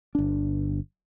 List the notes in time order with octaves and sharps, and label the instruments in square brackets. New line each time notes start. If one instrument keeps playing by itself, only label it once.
[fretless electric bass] G1 D4